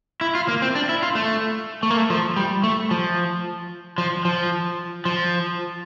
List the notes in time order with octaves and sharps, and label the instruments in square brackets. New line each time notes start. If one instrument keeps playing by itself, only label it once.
[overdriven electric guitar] E4
F4
A#3
C4
D4
E4
F4
A3
A3
A#3
A3
F3
G3
A3
F3
F3
F3
F3